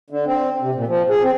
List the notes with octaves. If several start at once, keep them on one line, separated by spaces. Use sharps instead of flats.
D3
C4
C3
A#2
F3
G#4
C4